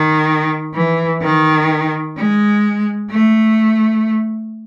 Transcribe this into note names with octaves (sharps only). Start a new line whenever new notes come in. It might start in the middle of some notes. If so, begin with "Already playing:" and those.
Already playing: D#3
E3
D#3
G#3
A3